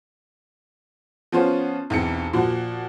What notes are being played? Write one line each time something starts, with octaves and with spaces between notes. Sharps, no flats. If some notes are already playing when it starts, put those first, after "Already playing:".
F3 B3 C#4 F4 C5
B1 E2 C4 C#7
A#2 F3 F#4